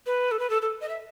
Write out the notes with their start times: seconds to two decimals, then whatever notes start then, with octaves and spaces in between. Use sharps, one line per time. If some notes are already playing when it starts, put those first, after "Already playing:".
0.06 B4
0.31 A4
0.40 B4
0.50 A4
0.62 A4
0.81 D#5
0.89 E5